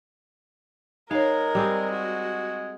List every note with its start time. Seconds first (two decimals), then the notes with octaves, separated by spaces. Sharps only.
1.11 G#3 D#4 A#4 C#5 F5
1.55 G3 C4 G#4
1.92 F#4